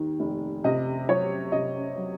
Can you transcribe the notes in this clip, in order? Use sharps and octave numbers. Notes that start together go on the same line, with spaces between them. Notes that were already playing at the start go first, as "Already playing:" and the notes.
Already playing: D#2 D#3
F1
C3 D#5
F#3 C#5
C3 D#5
F#3